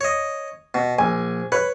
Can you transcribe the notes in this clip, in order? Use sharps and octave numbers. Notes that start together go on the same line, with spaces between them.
C#5 D#5
B2
A#1 G#5
B4 C#5